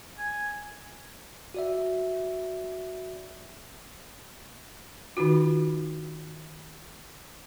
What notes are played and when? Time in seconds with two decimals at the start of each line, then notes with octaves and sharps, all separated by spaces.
0.18 G#5
1.54 F#4 D5 E5
5.17 D#3 D#4 F4 F#4